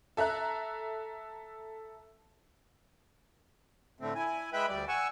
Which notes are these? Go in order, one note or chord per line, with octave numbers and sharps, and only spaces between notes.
A4 E5 A#5 F#6
A2 D3 A3 C4
E4 G#5
G#3 B4 E5 G5 B5
D2 G3 D5
F#5 G#5 C#6 E6